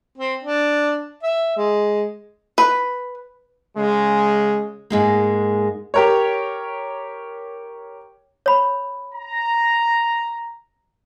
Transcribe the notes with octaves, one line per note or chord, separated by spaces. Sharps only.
C4
D4
E5
G#3
B4
C#3 G#3
G#2 G#3 A#3
G4 A#4 C#5
C#5 B5
A#5